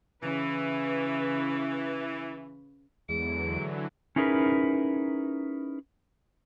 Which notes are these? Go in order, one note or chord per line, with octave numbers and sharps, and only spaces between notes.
C#3 E3 B4
E2 G#2 D3 E3 F#3 D7
C#4 D#4 E4 G#4 A#4 B4